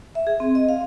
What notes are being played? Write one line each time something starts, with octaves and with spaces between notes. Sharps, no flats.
E5
G#4
C4
D#5
F5